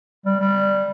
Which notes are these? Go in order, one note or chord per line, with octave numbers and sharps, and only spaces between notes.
G3
G3